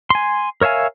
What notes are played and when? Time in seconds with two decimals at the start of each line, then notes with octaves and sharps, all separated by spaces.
0.10 G#5 C6
0.61 A#4 C#5 E5 F5 G#5